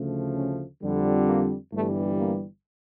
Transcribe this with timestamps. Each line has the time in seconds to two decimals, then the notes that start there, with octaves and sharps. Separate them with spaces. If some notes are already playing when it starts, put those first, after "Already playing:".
Already playing: D2 C#3 F3 A3
0.36 C#4
0.82 F2 D3 G3
1.27 A#3
1.72 G1 G2 E3 G3 A3
2.18 A#3